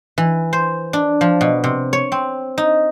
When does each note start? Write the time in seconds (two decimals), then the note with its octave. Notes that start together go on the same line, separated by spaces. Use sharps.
0.18 E3
0.53 C5
0.93 D4
1.21 F3
1.41 B2
1.64 C3
1.93 C#5
2.12 C4
2.58 D#4